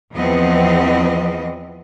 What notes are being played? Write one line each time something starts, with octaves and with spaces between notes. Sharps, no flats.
E2 E3 F3 B3 C4 D#5